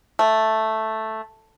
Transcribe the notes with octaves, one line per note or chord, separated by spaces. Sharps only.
A3